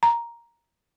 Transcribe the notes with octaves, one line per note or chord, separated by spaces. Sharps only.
A#5